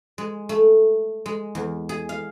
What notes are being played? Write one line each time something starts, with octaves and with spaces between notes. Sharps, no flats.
G#3
A3
G#3
E2
G#4
F5